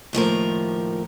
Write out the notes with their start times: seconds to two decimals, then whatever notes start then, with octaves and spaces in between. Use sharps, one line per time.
0.13 D#2 A2 F3 A#4